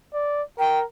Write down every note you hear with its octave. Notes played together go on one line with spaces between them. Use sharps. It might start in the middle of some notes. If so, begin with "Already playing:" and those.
D5
A#4 G5